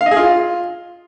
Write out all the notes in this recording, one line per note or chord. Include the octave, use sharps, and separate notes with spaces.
F5
D#5
G#4
F4